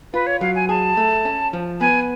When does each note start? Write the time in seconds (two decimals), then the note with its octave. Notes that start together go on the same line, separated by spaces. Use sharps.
0.13 F4 B4
0.27 C#5
0.41 F#3 F5
0.55 G#5
0.69 G#4 A5
0.97 A3
1.25 C#4
1.53 F3
1.81 B3 G#5